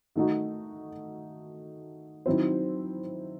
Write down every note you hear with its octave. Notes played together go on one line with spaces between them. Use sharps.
D#3 A3 D#4 F#4
D#3 F#3 C4 E4 C5